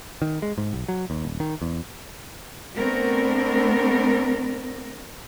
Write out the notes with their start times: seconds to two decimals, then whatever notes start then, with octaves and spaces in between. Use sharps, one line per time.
0.22 D#3
0.42 G#3
0.58 G#2
0.73 B1
0.88 F#3
1.10 D#2
1.25 D#1
1.40 D#3
1.62 E2
2.76 A3 B3 C4 D4 A#4